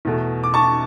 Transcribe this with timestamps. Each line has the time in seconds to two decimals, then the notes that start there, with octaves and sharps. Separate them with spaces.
0.05 E2 B2 A3
0.43 D6
0.54 A5 C#6